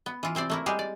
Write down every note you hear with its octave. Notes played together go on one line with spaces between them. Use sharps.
B3
E3 F4
C3 C4 C5 D5
A3 A#3 E4
G3 G#3 G4 G#4
D5